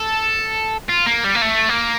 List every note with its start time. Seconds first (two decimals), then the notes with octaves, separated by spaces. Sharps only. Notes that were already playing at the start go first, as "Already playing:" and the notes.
Already playing: A4
0.89 F4
1.06 A#3
1.24 G3
1.35 A#3
1.42 A3
1.69 A#3